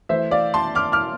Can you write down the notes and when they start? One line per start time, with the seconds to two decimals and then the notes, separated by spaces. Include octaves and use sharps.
0.09 E3 A3 E4 C5 E5
0.31 D5 F5
0.54 A5 C6
0.75 D6 F6
0.92 D6 F6